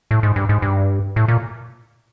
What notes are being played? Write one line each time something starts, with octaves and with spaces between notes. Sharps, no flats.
A2
G#2
G2
G#2
G2
A2
A#2